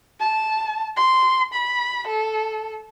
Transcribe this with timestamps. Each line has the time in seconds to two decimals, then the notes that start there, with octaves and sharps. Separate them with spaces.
0.20 A5
0.97 C6
1.54 B5
2.08 A4